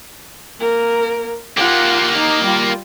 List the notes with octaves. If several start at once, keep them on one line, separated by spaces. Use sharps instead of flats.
A#3 A#4
A#3 F4 G4 F#5
D#4
G3 F4